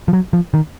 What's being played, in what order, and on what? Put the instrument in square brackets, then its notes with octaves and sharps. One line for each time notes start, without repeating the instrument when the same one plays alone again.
[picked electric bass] F3
F#3
F3
D#3